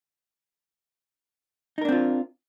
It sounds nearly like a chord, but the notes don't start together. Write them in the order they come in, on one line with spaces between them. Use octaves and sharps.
D#4 A#4 D4 C4 F4